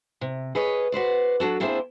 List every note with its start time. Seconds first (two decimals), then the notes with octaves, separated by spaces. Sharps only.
0.21 C3
0.55 G#4 B4 C#5 D#5
0.92 F#4 B4 C5 D5
1.40 F#3 D4 F#4 A4
1.60 A#3 C4 D4 E4 G#4 C5